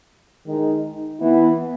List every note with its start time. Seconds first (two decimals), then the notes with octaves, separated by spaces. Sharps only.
0.46 D#3 G#3 D#4
1.20 E3 B3 E4